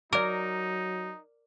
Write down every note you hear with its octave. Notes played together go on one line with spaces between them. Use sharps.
F#3 D#4 A#4 D5 D6